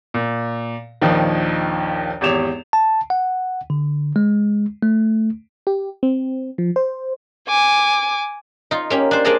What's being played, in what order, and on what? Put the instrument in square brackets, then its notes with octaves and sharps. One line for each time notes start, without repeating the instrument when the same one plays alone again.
[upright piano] A#2
A#1 D#2 D#3 F3
G#1 E2 G4 C#5 E7 F7
[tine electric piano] A5
F#5
D3
G#3
A3
[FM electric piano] G4
C4
F3
C5
[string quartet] G#5 D6
[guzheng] D#4 F4
A#3 C#4 G4
D4 C5
A#3 D4 G#4 D5 D#5 A5